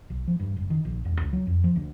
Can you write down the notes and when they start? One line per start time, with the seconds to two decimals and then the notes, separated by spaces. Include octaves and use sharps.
0.10 B1
0.28 F3
0.40 G2
0.56 F#1
0.70 D#3
0.85 A#1
1.05 E1
1.20 C#2
1.33 F#3
1.47 F2
1.64 F3
1.76 D2